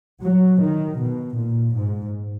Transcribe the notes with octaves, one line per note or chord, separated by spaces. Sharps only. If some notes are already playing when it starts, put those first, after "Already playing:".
F#3
D#3
B2
A#2
G#2